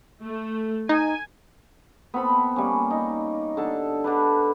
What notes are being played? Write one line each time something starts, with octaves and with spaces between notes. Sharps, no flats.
A3
D#4 G#5
B3 C4 A4 B5
G3 A#3 C#4
D#4
D3 A4 A5
D3 D4 B4